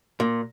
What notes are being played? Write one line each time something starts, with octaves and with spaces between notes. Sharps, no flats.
A#2